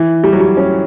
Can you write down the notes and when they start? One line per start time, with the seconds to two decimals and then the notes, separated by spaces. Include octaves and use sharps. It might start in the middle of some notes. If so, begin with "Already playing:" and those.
Already playing: E3
0.24 G3
0.33 F#3
0.40 G3
0.57 C#4